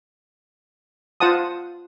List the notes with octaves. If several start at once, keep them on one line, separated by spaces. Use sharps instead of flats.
F4 C5 F#5 A5 D#6